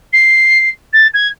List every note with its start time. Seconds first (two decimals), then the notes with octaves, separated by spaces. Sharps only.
0.13 C7
0.93 A6
1.13 G#6